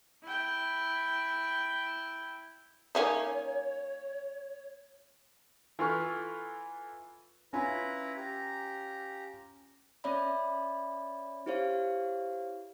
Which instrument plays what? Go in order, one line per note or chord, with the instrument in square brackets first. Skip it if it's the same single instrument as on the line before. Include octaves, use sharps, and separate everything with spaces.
[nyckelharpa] E4 G5
[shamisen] A#3 C#4 D#4 [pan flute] C#5
[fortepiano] E3 F4 A4 B4 C#6 F6
[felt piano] C#4 F4 G#5 [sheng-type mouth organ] E4 B4 A#5
[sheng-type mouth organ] G4 A#5
[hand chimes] C#4 C#5 D5 E5 B5
E4 G4 C5 C#5 F5